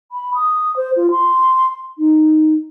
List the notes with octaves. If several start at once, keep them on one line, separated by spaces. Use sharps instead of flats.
B5
D#6
C5
F4
C6
D#4